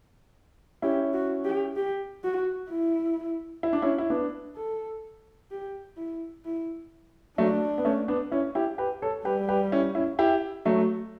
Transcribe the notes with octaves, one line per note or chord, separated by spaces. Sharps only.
C#4 E4 G4
F#4
G4
G4
F#4
E4
E4
D4
C#4 E4
E4
B3 D4
A4
G4
E4
E4
F#3 A3 D4
B3
A3 C#4
B3 D4
C#4 E4
E4 G4
G4 B4
A4 C#5
G3 G4 B4
G4 B4
C#4 E4
C#4 E4
E4 G4
F#3 A3